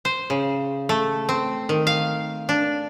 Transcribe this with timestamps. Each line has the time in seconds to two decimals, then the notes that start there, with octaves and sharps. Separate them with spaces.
0.05 C5
0.30 C#3
0.89 A3
1.29 C4
1.69 D#3
1.87 F5
2.49 D4